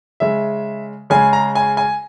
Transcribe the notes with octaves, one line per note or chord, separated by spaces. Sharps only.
C#3 G#3 E5
C#3 G#3 G#5
A#5
G#5
G#5